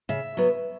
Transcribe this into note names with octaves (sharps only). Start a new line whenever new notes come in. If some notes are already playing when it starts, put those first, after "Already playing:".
C#3 E5
F#3 B3